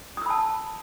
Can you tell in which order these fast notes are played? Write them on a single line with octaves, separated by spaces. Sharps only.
D#6 E6 B5 A5